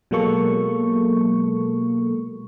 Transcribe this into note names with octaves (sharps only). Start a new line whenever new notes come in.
B2 F#3 G#3 A#3 A4 C#6